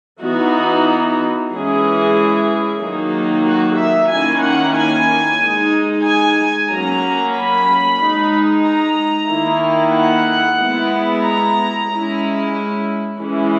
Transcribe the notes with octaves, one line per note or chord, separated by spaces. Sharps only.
E3 B3 D#4 F#4
E3 G#3 C#4 E4 G#4
D#3 F#3 A#3 D#4
F#4
E5
D#3 A#3 C#4 E4 G#5
F#5
G#5
G#3 D#4
G#5
F#3 A#3 C#4 A#5
B5
G#3 D#4
A#5
D#3 A#3 E4
F#5
G#3 B3 E4
A#5
G#3 C#4 E4
E3 G#3 C#4 E4